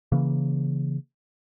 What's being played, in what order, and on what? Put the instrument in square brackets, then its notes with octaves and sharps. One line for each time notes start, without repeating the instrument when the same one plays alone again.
[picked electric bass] C#3 E3 A#3